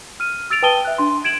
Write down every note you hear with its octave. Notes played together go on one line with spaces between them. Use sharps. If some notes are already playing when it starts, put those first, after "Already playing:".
F6 D#7
E6 A6 D7 F7
B4 G5 A5 D#6 D#7 G7
E5 F#6
D4 C6
G#6 D7 E7 F#7